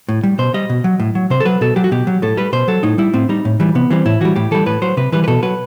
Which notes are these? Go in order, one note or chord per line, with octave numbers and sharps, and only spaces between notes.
A2
G3
B2 C5
G3 D#5
B2
F#3
A2
F#3
C3 C5
A4
F#3 B4
B2 A4
F#3 G4
F#4
B2 G4
F#3
A2 A4
G3 B4
B2 C5
F#3 A4
A2 D#4
G3 E4
A2 C4
G3 D#4
A2
E3 G3
C3 B3
E3 G3 C4
A2 E4
E3 G3 F#4
A2 G4
E3 G3 A4
A2 B4
F#3 C5
C3 B4
E3 G3 B4
B4
B2 A4
F#3 B4